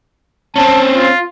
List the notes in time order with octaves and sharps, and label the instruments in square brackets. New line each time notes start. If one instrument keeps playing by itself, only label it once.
[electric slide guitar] C4 C#4 [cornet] A5
[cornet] F4